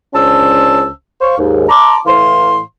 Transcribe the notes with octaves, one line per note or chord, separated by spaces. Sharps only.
C#2 C#4 D4 C5 A5 E6
C5 F5 C#6
D#2 G#2
A5 A#5 C6 D6
A2 E3 F5 C6